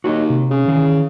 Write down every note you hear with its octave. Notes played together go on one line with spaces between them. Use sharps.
D#2 F#4 C#5 D#5
C3
C#3
D#3 E3 G#4